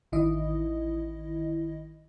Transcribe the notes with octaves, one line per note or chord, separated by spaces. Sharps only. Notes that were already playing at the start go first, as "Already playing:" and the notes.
A1 D#3 E4 D#5